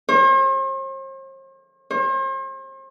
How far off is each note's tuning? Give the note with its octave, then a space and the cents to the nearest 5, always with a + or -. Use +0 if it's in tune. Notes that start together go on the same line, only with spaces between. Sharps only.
C5 +45
C5 +40